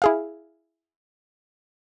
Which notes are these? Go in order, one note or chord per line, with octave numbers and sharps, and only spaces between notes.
E4 G#4 F5